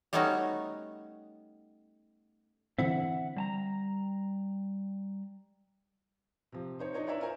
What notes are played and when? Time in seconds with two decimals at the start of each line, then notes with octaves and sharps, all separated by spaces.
0.13 G3 A3 B3 C#4 D#4 F#4
2.79 D3 E3 C4 E5 F#5
3.37 G3 A5 A#5
6.52 C3 F3
6.79 D#4 C5 C#5
6.94 D4 D#4 C#5 D#5
7.07 E4 B4 C#5 D5 E5 A#5
7.20 F4 A#4 C5 G#5 A#5